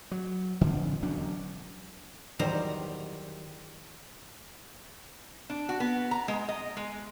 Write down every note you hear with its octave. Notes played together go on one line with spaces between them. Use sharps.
F#3
A#1 F2 D3 D#3
E1 F#3 C#4 D4
E2 D#3 F#3 G3 C5 A#5
D4
F#4
B3
A#5
G#3
D#5
G#3